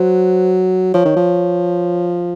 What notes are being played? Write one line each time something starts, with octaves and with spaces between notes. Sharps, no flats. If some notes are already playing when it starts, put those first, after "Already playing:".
Already playing: F#3 C5
F3 C#5
D#3
F3